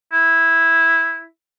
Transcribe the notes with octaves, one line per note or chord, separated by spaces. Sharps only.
E4